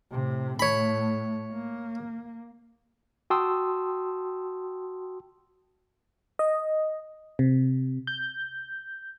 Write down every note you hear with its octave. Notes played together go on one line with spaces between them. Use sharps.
A2 C3
A2 A3 C#5 B5
A#3
F#4 G5 A5 C6 D#6 E6
D#5
C3
G6